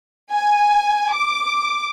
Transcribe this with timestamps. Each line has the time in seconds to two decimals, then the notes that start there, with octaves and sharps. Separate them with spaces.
0.32 G#5
1.14 D6